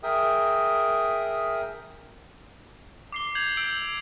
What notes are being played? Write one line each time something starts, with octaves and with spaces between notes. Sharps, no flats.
G#4 A#4 E5 G5 D#6
D6 C7 G7
G6 G#6 C7 F7 F#7
E6 G6 D7 F#7